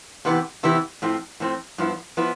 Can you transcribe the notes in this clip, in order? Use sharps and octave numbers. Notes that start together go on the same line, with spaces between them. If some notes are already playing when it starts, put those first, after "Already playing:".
C3 E3 B3 E4 G4
C3 E3 B3 E4 G4
A2 F3 C4
A2 F3 C4
G2 F3 B3 E4
F3 B3 E4